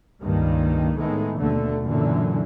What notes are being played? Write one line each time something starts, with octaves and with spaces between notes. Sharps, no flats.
C#2 G2 D#3 A#3
A2 D#3 G#3 A3 B3
D#2 B2 D3 A3
F#2 A#2 D3 E3